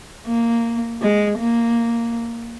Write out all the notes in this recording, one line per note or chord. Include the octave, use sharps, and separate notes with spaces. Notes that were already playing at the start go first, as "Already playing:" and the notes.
A#3
G#3
A#3